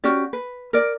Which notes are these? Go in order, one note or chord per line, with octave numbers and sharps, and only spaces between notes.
C#4 F#4 G4 D5
B4
A#4 D5